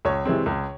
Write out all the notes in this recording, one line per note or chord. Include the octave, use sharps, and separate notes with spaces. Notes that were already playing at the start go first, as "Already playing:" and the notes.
C#2 C#5
C3 E3 G#3 C4
C#2